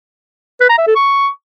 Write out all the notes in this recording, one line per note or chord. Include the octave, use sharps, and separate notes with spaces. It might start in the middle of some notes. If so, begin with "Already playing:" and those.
B4
A#5
E5
A4
C#6